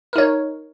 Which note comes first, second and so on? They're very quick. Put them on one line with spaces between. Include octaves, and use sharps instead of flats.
A#4 D#4 C#5